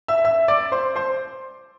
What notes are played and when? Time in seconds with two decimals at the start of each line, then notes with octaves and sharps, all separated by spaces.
0.08 E5 E6
0.25 E5 E6
0.48 D5 D6
0.72 C5 C6
0.96 C5 C6